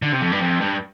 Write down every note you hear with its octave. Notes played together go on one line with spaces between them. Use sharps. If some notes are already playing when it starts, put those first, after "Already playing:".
D3
C3
F2
G2
F2
G2